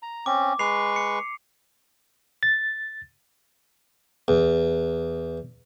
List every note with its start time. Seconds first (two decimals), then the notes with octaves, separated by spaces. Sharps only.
0.02 A#5
0.26 C4 C#4 D6
0.59 G#3 B4 C#6 C7 F7
0.96 C#7
2.43 A6
4.28 E2